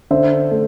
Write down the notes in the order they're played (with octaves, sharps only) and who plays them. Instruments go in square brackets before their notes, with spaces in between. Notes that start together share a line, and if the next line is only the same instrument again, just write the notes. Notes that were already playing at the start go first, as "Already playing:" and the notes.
[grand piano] D3 C5 E5
A3